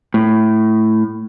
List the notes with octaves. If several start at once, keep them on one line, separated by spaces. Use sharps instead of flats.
A2